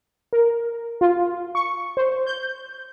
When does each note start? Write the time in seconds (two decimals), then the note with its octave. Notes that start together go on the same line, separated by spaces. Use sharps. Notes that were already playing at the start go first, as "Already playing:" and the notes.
0.33 A#4
1.01 F4
1.55 C#6
1.97 C5
2.27 G6